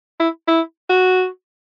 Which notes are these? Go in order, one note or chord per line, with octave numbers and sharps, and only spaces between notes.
E4
E4
F#4